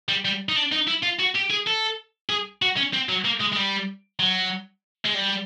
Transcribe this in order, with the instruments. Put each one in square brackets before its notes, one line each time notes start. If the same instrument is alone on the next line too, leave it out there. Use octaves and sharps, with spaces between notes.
[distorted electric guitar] G3
G3
D#4
D4
D#4
E4
F4
F#4
G4
G#4
A4
G#4
F#4
C#4
C4
F#3
A#3
G#3
G#3
G3
F#3
G#3
G3